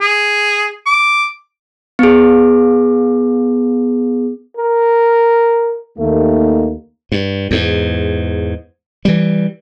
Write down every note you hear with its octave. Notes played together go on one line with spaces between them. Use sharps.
G#4
D6
B3 G#4
A#4
D#2 D#3 A3 A#3
G2
E2 G#2
E3 G3